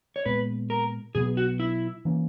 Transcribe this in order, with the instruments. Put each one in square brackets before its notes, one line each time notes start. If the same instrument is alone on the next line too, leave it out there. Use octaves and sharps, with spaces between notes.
[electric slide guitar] C#5
[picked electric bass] A#2 G#3 B3 [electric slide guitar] B4
[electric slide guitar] A#4
[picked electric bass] B2 F#3 B3 [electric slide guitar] G#4
[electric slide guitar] F#4
E4
[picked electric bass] E3 A#3 C#4